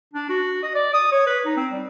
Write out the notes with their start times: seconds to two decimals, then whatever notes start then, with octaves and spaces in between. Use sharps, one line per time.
0.13 D4
0.29 F#4
0.63 D#5
0.74 D5
0.93 D#6
1.12 C#5
1.26 B4
1.45 D#4
1.57 C4
1.72 G3